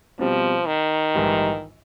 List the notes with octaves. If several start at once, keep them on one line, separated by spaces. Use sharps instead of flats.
B2 F3 G3 C4
D#3
A#1 G#2 E3 G3